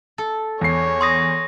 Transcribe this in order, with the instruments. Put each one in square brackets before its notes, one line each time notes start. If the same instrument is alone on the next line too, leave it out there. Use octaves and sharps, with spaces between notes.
[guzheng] A4
[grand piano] E2 C7 [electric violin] C#5
[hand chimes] C6 D#6 A#6